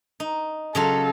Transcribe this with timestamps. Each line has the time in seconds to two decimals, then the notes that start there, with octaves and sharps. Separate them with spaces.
0.20 D#4
0.75 C#3 F#3 F4 A4